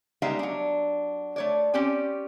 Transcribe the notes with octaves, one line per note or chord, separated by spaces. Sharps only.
G3 G#3 B3 D#4 E5 F5
F#3 D4
A3 C#5 D5
C4 C#4 G4 D5 G#5